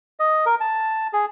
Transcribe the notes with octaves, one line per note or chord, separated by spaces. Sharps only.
D#5
A#4
A5
G#4